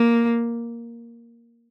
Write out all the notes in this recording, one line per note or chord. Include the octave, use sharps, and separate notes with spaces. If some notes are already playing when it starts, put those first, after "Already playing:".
Already playing: A#3